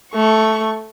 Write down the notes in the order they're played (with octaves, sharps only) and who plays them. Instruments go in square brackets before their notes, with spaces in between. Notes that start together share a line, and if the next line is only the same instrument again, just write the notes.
[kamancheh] A3 C#6